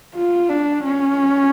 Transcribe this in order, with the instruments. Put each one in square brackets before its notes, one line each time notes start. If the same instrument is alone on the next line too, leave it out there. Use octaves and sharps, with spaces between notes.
[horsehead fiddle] F4
D4
C#4